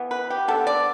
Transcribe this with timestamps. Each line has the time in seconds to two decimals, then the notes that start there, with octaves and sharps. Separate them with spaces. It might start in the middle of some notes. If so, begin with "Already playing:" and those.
Already playing: E3 B3
0.11 B4
0.30 G4
0.48 D3 B3 A4
0.67 D5